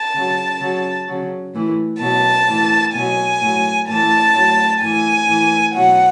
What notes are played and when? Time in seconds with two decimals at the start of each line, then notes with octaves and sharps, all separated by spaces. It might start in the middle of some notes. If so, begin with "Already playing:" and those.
Already playing: A5
0.14 C#3 F#3
0.61 C#3 F#3
1.08 C#3 F#3
1.54 A2 E3
2.01 B2 F#3 A5
2.48 A2 E3
2.95 B2 F#3 G#5
3.41 A2 F#3
3.88 A2 E3 A5
4.34 A2 F#3
4.81 A2 E3 G#5
5.28 A2 E3
5.75 B2 F#3 F#5